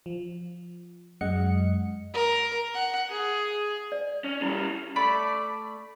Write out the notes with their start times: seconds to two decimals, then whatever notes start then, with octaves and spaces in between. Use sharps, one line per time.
0.06 F3
1.21 F#2 G#3 D#5 F#5 C#7
2.14 A#4
2.74 F#5
3.09 G#4
3.92 D5
4.24 C#4
4.42 G3 C#4 E4
4.96 A3 D5 A5 B5